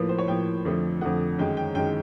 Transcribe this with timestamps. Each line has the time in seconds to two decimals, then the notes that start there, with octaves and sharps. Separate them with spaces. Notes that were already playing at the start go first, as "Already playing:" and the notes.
Already playing: A2 F3 A#3 B4
0.09 C5
0.18 C#5
0.28 A2 F3 A#3 G5
0.65 F2 D3 F3 A3
1.01 F2 D3 F3 A3 F#5
1.38 F#2 D#3 G#3 G5
1.57 G5
1.75 F#2 D#3 G#3 G5